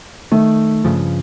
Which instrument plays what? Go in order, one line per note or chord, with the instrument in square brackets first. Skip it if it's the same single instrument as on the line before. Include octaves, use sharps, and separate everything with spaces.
[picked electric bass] D#3 [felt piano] A3
[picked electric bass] G2 C#3 F3